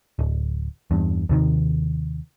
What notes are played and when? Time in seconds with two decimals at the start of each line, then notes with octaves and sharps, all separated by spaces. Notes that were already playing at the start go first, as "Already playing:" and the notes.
0.19 D1
0.91 E2 G2
1.29 D#2 C3 D#3